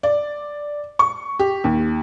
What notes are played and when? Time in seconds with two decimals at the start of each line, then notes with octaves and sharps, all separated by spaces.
0.03 D5
0.99 C#6
1.39 G4
1.64 D#2